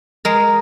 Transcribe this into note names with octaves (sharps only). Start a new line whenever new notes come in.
G#3 A#4